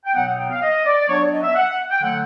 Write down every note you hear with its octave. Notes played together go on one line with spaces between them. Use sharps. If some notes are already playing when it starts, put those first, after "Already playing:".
G5
B2 F#3 B3 D#4 F#5
F#5
G5
F5
D#5
D5
F#3 B3 D4 C#5
D5
D#5
E5
F#5
G5
D3 F#3 A3 F#5